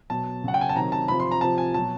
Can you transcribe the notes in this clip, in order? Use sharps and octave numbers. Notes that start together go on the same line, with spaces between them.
B2 F#3 A5
C#3 F#3 F#5
G5
G#5
A5
C3 D#3 F#3 A#5
A5
C3 F3 B5
C6
A#5
C3 F3 A5
G#5
B2 F#3 A5